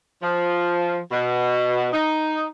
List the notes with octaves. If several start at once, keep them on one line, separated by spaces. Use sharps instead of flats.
F3
B2
D#4